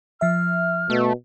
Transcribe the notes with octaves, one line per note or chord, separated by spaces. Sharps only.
F3 E5 F6
B2 A3